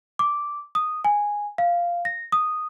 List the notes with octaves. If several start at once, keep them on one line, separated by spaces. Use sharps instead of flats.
D6
D#6
G#5
F5
A#6
D#6